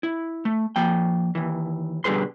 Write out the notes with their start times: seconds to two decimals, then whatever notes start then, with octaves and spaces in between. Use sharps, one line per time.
0.03 E4
0.45 A3
0.76 F3 A#3 G5
1.35 D#2 E3
2.04 B2 D3 G3 G#4 B4 C6